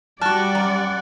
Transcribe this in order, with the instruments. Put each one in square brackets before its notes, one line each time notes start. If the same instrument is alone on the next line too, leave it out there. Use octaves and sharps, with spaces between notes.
[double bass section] G3 [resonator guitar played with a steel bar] F#4 A5 [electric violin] D5 F#5 [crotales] F6 F#6 A6
[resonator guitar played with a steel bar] F#2 A#5